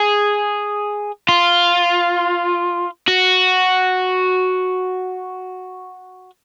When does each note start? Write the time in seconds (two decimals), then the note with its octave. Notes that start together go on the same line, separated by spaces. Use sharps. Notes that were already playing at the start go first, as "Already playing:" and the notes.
Already playing: G#4
1.29 F4
3.08 F#4